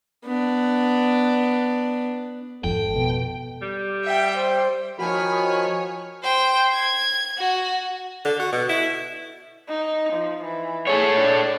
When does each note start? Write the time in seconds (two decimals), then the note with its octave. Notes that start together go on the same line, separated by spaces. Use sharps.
0.24 B3 D4
2.64 G#1 F2 A4 G5
2.96 B2
3.62 G3
4.04 E5 G5
4.36 C5
4.99 D#3 F3 F#4 C#5 G#5 B5 F6
6.23 C5 G5
6.73 G#6
7.38 F#4
8.25 D3
8.39 F#4
8.52 B2
8.69 E4
9.68 D#4
10.13 F3
10.45 E3
10.87 G#4 A4 C#5
11.21 D4